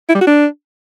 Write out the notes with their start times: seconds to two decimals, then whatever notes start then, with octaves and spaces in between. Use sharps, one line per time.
0.09 E4
0.15 G3
0.21 F#4
0.27 D4